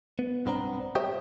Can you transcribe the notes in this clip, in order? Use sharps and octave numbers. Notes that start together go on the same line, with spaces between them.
B3
B1 G2 B3 C4 D4 A#5
G4 C5 C#5 D#5 E5 G5